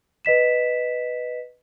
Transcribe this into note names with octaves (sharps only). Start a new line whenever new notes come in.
B4 D#5 B6 E7